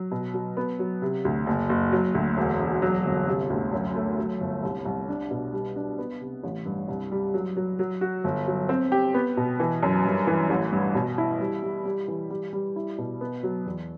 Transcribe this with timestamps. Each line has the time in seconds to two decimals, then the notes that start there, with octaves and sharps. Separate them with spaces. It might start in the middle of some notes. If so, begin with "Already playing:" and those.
Already playing: F#3
0.11 B2
0.34 F#3
0.57 B3
0.79 F#3
1.02 C3
1.25 D2
1.47 F#1
1.69 F#1
1.92 F#3
2.15 D2
2.37 E1
2.59 E1
2.82 F#3
3.05 G1
3.27 C3
3.50 D2
3.73 F#2
3.95 A3
4.18 F#3
4.40 G1
4.63 C2
4.85 C2
5.08 D4
5.31 B2
5.53 G3
5.76 D4
5.98 B3
6.21 C3
6.44 A1
6.66 G2
6.88 C2
7.12 G3
7.34 F#3
7.57 F#3
7.79 F#3
8.01 F#4
8.24 G1
8.47 F#3
8.69 C4
8.92 G4
9.14 B3
9.37 B2
9.60 E3
9.83 F#2
10.05 G2
10.27 E3
10.50 A1
10.72 G2
10.95 B2
11.18 E4
11.40 G3
11.63 G3
11.85 G3
12.08 E3
12.30 G3
12.53 G3
12.76 E4
12.98 B2
13.21 B3
13.43 F#3
13.66 E2